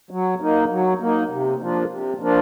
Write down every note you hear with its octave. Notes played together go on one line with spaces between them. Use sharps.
F#3
A#3 D#4
F#3
A#3 D#4
C3
F3 A#3 D4 F4
C3
F3 A#3 D4 F4